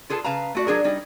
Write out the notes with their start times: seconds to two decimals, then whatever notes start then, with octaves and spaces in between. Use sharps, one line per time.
0.10 F4 G#4 A4 B4 A5
0.24 C#3 B4 F5 A5 A#5
0.55 A3 F#4 D5
0.67 F#3 D4 G#4 A#4
0.84 G3 D#4 G#4